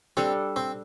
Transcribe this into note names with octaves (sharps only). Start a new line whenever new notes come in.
G3 C4 D4 A4
C4